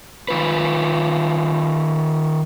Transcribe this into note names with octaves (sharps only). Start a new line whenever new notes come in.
D#3 F4 B4